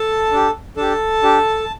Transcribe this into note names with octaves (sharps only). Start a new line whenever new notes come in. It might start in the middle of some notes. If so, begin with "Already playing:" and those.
Already playing: A4 A5
D4 G4
D4 G4 A4 A5
D4 G4